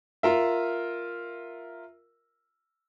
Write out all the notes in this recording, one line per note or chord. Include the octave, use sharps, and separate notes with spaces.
F4 A#4 E5